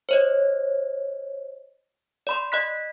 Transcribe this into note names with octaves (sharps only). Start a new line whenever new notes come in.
C5 C#5 D#5
D5 B5 C6
D#5 B5 F#6 B6